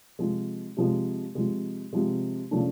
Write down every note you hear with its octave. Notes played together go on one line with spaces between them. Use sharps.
C3 F3 G#3
C3 F3 G#3
C3 F3 G#3
C3 F3 G#3
C#3 F3 A3 D4